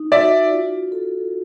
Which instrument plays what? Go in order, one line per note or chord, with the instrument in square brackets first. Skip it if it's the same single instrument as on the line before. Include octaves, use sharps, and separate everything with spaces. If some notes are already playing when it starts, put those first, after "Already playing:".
Already playing: [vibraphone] D#4
[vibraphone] F#4 [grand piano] D5 E5
[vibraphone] F4
A4